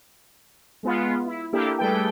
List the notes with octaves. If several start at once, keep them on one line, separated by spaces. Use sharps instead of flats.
G#3 B3 F4
E4
A#3 D4 E4 G4 A4
G3 A3 G#4 A4 B4 G5